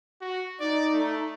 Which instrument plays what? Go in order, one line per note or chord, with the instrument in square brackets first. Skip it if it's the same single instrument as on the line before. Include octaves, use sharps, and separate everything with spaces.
[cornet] F#4
[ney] D#4 [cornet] D5
[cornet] A3